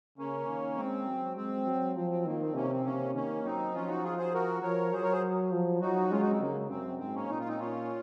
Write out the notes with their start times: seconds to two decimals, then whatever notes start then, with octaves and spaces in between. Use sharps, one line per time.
0.18 C#3 A#3 C#4
0.48 D#3
0.77 G#3 C4
1.07 F#3
1.37 G#3 C4
1.66 F#3
1.96 F3 C4
2.11 C4
2.26 D#3 A#3
2.41 C4
2.55 C3 A#3 C#4
2.70 C4
2.85 C3 A#3 C#4
3.14 D#3 A#3 C#4
3.44 F#3 C4 D#4
3.74 F3 C#4 F4
3.88 D#4 F#4
4.03 F4 G#4
4.18 G#4 C5
4.34 F#4 A#4
4.62 F3 A#4 C#5
4.92 F#3 G#4 C5
5.02 A#4 C#5
5.12 G#4 C5
5.52 F3
5.81 F#3 D#4 F#4
6.11 G#3 C#4 F4
6.21 D#4 F#4
6.31 C4
6.40 C#3 A#3
6.70 F#2 C4
6.99 G#2 C4
7.14 A#3 C#4
7.29 A#2 D#4
7.39 F4
7.48 C4 D#4
7.59 A#2 C#4 F4